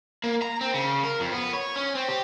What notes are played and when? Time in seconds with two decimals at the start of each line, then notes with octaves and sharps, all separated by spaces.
0.24 A#3
0.42 A#5
0.61 C4
0.74 C#3
1.04 A#4
1.20 F2
1.32 B3
1.53 C#5
1.76 C#4
1.95 C4
2.09 G4